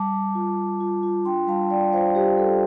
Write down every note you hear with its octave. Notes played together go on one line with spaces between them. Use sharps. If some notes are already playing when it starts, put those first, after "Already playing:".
Already playing: G3 A5 D6
G3
F4
G3
F4
F4
D4 G5 C6
G3 F5 A5
A5
D4 D5 G5
F4 C5 F5
G3 G4 C5
G3 A4